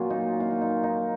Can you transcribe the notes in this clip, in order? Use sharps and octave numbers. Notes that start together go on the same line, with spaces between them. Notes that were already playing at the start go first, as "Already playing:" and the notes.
Already playing: A#2 F#3 A#3 C#4 F4
D#4
F4
F4
D#4
D#4